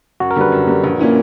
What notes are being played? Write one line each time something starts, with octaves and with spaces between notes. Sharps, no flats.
F#2 F#4
A#4
D3 G3 B4
F#2
D3 G3
A#1
A#2 A#3 C#4 E4